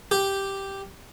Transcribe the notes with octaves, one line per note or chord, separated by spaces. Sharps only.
G4